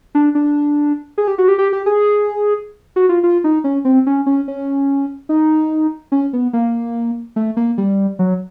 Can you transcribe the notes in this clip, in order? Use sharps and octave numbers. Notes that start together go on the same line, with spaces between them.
D4
D4
G#4
G4
F#4
G4
G4
G4
G#4
F#4
F4
F4
D#4
C#4
C4
C#4
C#4
C#4
D#4
C#4
B3
A#3
A3
A#3
G3
F#3